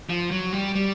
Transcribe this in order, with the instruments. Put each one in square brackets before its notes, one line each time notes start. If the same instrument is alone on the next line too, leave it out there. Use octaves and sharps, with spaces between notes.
[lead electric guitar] F3
F#3
G3
G3